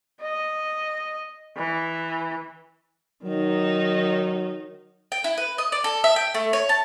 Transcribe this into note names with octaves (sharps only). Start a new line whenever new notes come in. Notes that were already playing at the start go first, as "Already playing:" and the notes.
D#5
E3
D#3 F#3 D#4
G5
E4
B4
D#5
D5
A4
E5
G5
A3
C#5
A5